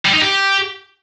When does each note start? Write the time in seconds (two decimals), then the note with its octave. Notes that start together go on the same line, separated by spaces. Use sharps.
0.05 G3
0.13 D#4
0.22 G4